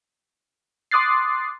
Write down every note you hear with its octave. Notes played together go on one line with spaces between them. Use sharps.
C6 D6 D#6 F#6 A6 C7